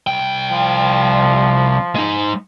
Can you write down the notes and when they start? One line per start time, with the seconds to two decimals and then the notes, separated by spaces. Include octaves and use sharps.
0.07 C2 G5
0.52 F3
1.95 G#3 D#4